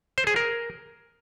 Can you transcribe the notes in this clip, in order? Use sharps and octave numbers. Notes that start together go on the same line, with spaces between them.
C5
G#4
A#4